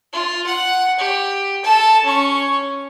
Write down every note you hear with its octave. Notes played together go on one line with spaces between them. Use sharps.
F4
F#5
G4
A4 A5
C#4 C#6